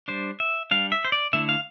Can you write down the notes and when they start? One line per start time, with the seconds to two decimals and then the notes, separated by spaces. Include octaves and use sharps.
0.08 G3 D4 C5
0.40 E5
0.71 G3 D4 F5
0.92 E5
1.05 C5
1.12 D5
1.33 D3 A3 E4 E5
1.49 F5